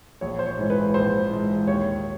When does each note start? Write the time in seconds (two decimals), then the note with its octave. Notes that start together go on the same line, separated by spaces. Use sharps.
0.21 A#1 C#5
0.39 C5
0.46 C#5
0.58 G#2 E3
0.70 B4
0.94 A#1 C5
1.31 G#2 E3
1.67 D#2 C#5